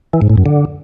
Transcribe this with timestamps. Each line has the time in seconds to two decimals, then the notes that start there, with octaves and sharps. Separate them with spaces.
0.13 E3
0.21 G#2
0.30 A2
0.38 F#2
0.46 D3